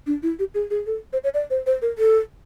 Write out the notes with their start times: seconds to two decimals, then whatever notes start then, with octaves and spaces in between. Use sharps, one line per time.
0.07 D4
0.23 E4
0.39 G4
0.54 G#4
0.70 G#4
0.86 A4
1.13 C5
1.24 C#5
1.34 D5
1.50 C5
1.66 C5
1.82 A#4
1.98 A4